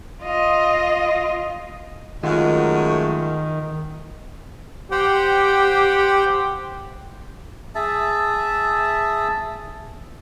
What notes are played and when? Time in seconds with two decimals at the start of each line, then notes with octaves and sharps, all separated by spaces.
0.23 F4 D#5
2.23 F#2 D#3 G#3 A3 F4 F#5
4.92 G4 C5 F#5 G5
7.75 G#4 E5 A5